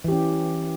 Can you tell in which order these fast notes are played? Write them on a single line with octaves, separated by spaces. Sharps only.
E3 G4 C#4